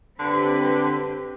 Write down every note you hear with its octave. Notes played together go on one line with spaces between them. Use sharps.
D3 C4 G4 B4